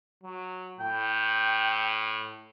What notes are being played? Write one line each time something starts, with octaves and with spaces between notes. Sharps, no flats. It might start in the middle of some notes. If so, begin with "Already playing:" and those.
F#3
A2 G5